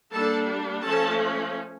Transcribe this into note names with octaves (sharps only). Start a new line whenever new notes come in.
G3 A#3 D4 A4 A5
F3 A3 C#4 A4 A5